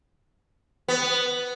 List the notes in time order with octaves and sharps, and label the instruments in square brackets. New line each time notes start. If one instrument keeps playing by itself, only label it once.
[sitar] B3